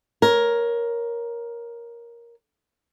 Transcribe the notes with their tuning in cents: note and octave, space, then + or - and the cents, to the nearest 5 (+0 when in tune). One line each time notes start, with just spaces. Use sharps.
A#4 +10 C#5 +0